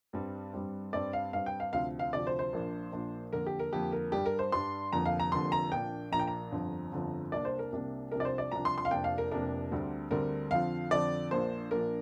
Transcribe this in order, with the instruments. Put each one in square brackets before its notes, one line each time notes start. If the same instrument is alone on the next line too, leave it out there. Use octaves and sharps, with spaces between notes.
[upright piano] G2 G3 C4
G2 G3 C4
G2 G3 C4 D5
F5
G2 G3 C4 F5
G5
F5
D2 C3 F3 C4 F5
F5
D2 C3 F3 C4 D5
C5
C5
A#1 A#2 A#3 D4
A#1 A#2 A#3 D4
F2 D3 A#3 A#4
G4
A#4
F2 D3 A#3 G4
A#4
G2 G3 D4 G4
A#4
C5
G2 G3 D4 C6
F1 F2 D3 F3 A#3 A#5
F5
A#5
F1 F2 D3 F3 A#3 C6
A#5
A#1 A#2 A#3 D4 G5
A#1 A#2 A#3 D4 A#5
G5
A#5
G1 F2 D3 F3 C4
G1 F2 D3 F3 C4
C2 C3 A#3 D4 D5
C5
A#4
C2 C3 A#3 D4
C2 C3 F3 D4 A#4
D5
C5
D5
C2 C3 F3 D4 A#5
C6
C6
F5
F1 F2 C3 A#3 D4 G5
F5
A#4
F1 F2 C3 A#3 D4 A#4
D2 D3 G3 C4
D2 D3 G3 C4 A#4
F2 D3 F3 C4 F5
F2 D3 F3 C4 D5
A#1 A#2 A#3 D4 C5
A#1 A#2 A#3 D4 A#4